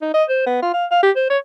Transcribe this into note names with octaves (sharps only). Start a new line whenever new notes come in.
D#4
D#5
C5
B3
F4
F5
F5
G4
C5
C#5